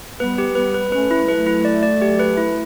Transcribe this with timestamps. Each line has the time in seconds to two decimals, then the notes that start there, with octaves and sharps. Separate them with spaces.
0.19 G3 B3 B4
0.38 G4
0.55 G3 B3 B4
0.74 B4
0.92 A3 C#4 B4
1.11 E4
1.28 F#3 A3 B4
1.46 E4
1.65 D5
1.83 D5
2.02 G4
2.19 B4
2.38 E4